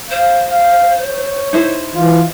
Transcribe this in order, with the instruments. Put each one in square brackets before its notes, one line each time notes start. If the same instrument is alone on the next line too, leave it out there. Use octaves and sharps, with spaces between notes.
[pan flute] C5 [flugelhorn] F5
[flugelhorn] F5
C#5
[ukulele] D#4 E4 C5
[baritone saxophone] E3 [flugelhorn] F4